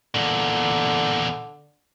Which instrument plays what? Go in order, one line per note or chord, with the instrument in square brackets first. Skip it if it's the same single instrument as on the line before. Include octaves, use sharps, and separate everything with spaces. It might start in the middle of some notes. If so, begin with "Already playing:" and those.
[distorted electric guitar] E2 A#2 [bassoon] D3